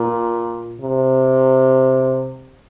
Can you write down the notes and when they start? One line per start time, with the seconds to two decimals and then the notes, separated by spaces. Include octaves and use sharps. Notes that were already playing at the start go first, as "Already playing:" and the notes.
Already playing: A#2
0.81 C3